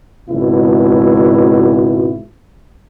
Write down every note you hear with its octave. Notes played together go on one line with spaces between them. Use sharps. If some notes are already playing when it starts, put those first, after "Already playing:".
G#1 C#2 B2 E4